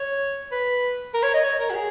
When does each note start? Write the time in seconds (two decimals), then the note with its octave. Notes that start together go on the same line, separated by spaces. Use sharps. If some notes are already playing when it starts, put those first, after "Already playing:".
Already playing: C#5
0.52 B4
1.14 A#4
1.23 C#5
1.34 D#5
1.44 C#5
1.59 A#4
1.70 F#4
1.74 G#4